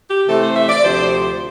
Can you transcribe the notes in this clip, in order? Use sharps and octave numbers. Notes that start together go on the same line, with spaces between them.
G4
C3 E3 A3 C4 A4
C5
E5
D5
D2 C3 F3 C5